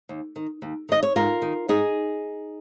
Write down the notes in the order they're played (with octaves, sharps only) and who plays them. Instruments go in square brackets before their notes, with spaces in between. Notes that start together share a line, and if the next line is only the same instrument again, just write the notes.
[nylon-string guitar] D#2
D#3
D#2
D#3 D#5
C#5
G#2 F4 A#4
D#3
G#2 D#4 G#4